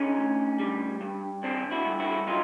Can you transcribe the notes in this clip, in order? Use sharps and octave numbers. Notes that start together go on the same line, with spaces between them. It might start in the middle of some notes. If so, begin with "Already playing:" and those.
Already playing: D3 C#4 D#4
D2
G3
G2
D3 C4 D4
E4 F#4
G2
E4 F#4
F#3 D#4 F4